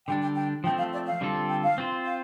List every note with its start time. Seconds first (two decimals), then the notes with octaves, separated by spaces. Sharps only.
0.08 D3 G3 D4 G5
0.22 G5
0.36 G5
0.64 F3 A3 C4 G5
0.78 F5
0.93 D5
1.07 F5
1.21 D3 G3 C4 F4 A4
1.50 G5
1.63 F5
1.78 C4 F4 C5
2.05 F5